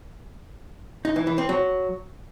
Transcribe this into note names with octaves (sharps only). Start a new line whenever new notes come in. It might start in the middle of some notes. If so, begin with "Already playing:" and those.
D#4
E3
E3
C4
F#3